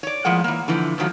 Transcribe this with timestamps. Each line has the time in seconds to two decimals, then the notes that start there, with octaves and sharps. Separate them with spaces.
0.03 C#5 D5
0.25 A2 F3 G#3 A#3 F#5
0.44 E3 A#3
0.68 D3 E3 F3
0.98 G#2 D#3 F3 F#3 A3